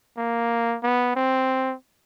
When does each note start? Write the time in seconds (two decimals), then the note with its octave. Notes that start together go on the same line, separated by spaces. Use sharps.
0.18 A#3
0.83 B3
1.16 C4